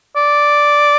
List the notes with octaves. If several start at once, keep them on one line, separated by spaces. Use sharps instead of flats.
D5